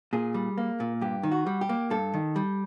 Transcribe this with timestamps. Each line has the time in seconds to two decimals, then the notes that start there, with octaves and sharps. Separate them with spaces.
0.13 A#2 G#4
0.34 G3
0.58 A#3
0.80 A#2
1.01 G2 G4
1.23 D#3
1.32 F#4
1.46 G3
1.61 G4
1.69 A#3
1.90 G2 A4
2.14 D#3
2.36 G3